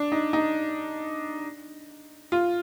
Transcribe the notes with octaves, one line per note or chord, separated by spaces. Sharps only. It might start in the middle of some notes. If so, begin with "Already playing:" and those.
Already playing: D4
D#4
D#4
F4